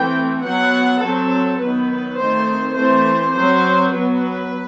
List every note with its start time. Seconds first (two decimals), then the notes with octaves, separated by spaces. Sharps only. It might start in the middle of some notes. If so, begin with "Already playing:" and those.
Already playing: E3 A3 C4 G5
0.43 F#3 B3 F#5
1.01 F#3 C4 A4
1.60 D#3 F#3 B3 B4
2.18 D#3 A3 C4 C5
2.76 E3 A3 C4 C5
3.34 F#3 C4 C5
3.91 F#3 B3 B4